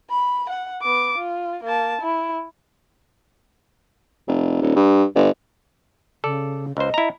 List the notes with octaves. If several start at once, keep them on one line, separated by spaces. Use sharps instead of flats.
B5
F#5
B3 D6
F4
A#3 A5
E4
F1
D#1
G2
G1
C#3 A4 D5
C#2 C5 D#5
E4 A#5